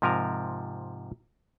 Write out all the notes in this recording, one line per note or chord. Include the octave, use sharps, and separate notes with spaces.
G#2 C3 F3 A#4 G#5 A#5